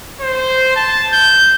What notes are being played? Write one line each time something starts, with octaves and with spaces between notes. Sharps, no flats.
C5
A5
G6